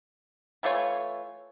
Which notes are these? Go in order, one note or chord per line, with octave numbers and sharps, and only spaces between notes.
E3 A3 F4 C#5